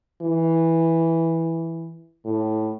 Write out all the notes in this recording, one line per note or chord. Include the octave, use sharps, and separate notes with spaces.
E3
A2